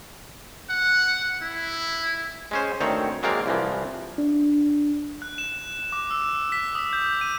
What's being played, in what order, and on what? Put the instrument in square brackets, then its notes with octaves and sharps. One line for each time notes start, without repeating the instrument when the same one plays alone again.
[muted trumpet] F#5
E4
[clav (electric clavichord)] G#3 C#4 C5
D2 D#3 C4 C#5
F#3 G#3 A#3 C4 D5 F5
C2 E3 F3
[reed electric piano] D4
[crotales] F#6
E7
D6
E6
B6
D#6
G6
D#7